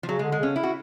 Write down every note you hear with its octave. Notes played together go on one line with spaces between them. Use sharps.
F3
C#3 F#3
G#3
D3
G#3
C#3 C#4
E4
F#4